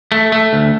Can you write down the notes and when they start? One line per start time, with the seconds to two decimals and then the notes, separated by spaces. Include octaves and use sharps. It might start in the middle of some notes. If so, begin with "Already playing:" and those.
0.12 A3
0.32 A3
0.53 D2